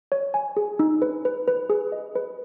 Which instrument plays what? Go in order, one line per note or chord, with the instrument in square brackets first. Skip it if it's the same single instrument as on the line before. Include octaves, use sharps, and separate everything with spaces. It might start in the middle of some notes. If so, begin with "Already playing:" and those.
[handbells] C#5
G#5
G#4
D#4
B4
B4
B4
G#4
D#5
B4